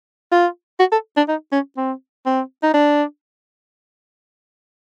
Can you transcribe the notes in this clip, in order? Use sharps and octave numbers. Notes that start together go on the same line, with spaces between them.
F4
F#4
A4
D4
D#4
C#4
C4
C4
D#4
D4